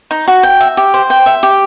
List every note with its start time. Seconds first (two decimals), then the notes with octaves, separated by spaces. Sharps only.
0.11 D#4
0.28 F#4
0.43 G5
0.60 E5
0.77 G4
0.94 C5
1.10 G5
1.26 E5
1.43 G4